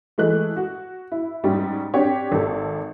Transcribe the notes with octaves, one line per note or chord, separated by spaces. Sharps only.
E3 G#3 A3 F#6
F#4
E4
G#2 G3 C#4
C4 D4 G4 C#5
G#1 A4